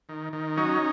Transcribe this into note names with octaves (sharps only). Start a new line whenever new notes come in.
D#3
D#3
F#3 C#4 D#4